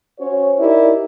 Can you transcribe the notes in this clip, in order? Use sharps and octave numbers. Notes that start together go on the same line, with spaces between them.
C#4 F#4 C5 C#5
D#4 E4 G4 A#4 D5